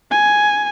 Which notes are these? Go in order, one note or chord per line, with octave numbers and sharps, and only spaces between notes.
G#5